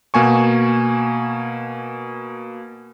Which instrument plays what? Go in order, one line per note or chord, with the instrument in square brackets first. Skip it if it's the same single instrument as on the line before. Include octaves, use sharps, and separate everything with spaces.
[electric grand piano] B2 A#3 G#5 C#6